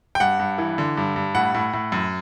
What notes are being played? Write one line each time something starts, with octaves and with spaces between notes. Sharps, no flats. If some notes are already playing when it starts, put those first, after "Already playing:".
G5
G2 F#5
G2
E3
D3
G2
G2
A2 F#5
A2
A2
F#2